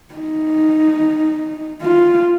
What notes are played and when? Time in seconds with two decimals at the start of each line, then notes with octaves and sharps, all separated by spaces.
0.15 D#4
1.82 F4